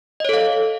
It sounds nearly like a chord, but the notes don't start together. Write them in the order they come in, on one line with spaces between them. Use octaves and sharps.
D#5 C#5 A4 F5